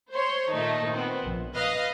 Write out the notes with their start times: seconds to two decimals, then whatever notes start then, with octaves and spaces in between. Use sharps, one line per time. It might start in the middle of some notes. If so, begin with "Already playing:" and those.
0.12 C5 C#5 C6
0.53 A#2 D#3 A3 D#4
0.92 B3 C4
1.24 A#1
1.54 B4 D#5 F5 F#6